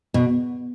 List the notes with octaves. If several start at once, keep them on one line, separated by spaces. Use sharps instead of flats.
B2